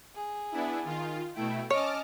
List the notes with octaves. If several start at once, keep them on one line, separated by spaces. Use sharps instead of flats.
G#4
B3 D4 E4
D#3 F4
B2 A3 E4 G5
C#4 C#5 D#5 A5 D6 F6